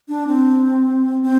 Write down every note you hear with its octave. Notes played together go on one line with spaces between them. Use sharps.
D4
C4
C4